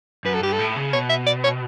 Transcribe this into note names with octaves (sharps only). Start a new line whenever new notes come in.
F#2 B4
A4
G2 G4
A4
A2
C#3
B2 C#5
E5
D5
C#5